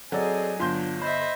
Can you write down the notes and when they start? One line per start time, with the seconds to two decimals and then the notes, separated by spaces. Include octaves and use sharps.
0.12 F#3 C4 G#4 A4 D5 D#5 G#5
0.60 G1 F#3 D4 F4 C6 G6
1.02 C5 D#5 E5 B5